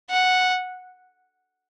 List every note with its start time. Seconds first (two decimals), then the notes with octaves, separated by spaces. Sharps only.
0.10 F#5